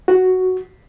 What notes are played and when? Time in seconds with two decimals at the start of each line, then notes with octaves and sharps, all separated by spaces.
0.08 F#4